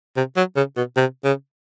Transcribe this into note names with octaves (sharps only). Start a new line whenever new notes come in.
C3
F#3
C#3
B2
C3
C#3